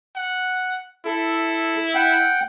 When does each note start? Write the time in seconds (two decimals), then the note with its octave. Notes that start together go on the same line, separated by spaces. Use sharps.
0.16 F#5
1.06 E4 A4
1.95 F#5 G5